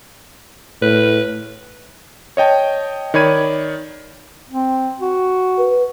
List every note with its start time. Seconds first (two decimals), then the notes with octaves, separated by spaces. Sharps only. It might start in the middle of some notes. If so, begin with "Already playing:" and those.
0.82 A2 B4
2.37 C#5 D#5 G5 A5
3.14 D#3 C#5 D5 B5 G#6 D#7
4.51 C4
5.00 F#4
5.58 B4